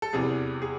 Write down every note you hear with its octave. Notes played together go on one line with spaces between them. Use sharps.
A4
E2 C3 E3 G3 G#4
G#4